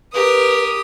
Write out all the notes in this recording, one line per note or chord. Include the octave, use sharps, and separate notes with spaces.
G4 A#4 B4 D#6